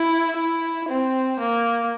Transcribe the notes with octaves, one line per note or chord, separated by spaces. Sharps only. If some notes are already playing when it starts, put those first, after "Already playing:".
Already playing: E4
E4
C4
A#3